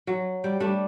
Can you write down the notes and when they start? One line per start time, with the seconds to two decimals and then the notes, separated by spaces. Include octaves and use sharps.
0.07 F#3
0.44 G3 G5
0.60 G3 A3 D4